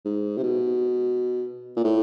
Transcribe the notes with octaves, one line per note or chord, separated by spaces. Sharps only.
G#2
C3
B2
A#2
A2